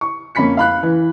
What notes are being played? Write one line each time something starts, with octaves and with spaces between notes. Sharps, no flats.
C#6
F2 A#3 C#4 B5 B6 C#7
F5 B5 F#6
E3